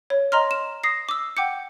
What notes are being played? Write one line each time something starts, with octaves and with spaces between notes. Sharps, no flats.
C#5
D#5 A#5 C6 F6
E7
D#6 A#6 C7
D6 E6
F#5 G5 D6 G6 C#7